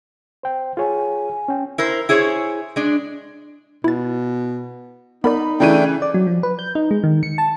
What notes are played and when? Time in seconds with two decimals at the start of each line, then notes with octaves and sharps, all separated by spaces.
0.43 C5 G5
0.77 F4 G#4 C#5 G#5
1.48 C#4 G5
1.78 E4 A#4 C5
2.09 E4 G#4 C5 C#5
2.76 G#3 D4
3.84 B2 E4 A6
5.24 B3 D#4 A#4 D5 B5
5.60 C#3 E3 A3 D4 G5 D#7
6.02 D5
6.14 F#3
6.27 F3
6.43 B4
6.59 G6
6.75 D#4
6.91 G#3
7.04 D#3
7.23 C#7
7.38 A5